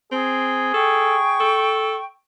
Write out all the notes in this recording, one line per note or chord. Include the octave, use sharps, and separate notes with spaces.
C4 G#4
A4 G5 C#6
A4